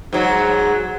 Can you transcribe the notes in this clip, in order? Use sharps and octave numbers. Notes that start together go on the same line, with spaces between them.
G#2 F#3